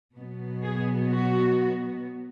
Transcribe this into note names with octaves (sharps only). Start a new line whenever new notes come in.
B2 F#3 B3
G#4
F#4